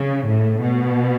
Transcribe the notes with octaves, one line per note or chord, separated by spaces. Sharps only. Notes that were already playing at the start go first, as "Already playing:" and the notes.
Already playing: C#3
A2
B2